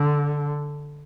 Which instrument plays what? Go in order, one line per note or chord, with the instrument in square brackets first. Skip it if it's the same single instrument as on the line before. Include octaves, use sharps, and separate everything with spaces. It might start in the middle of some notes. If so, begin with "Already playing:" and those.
Already playing: [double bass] D3